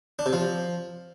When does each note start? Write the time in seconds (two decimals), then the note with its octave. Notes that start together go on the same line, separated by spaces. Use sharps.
0.19 D4
0.26 C3
0.33 F3